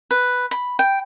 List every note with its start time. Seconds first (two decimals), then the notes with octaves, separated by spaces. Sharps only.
0.11 B4
0.51 B5
0.79 G5